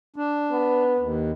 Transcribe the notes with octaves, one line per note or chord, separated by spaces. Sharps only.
D4
B3
D#2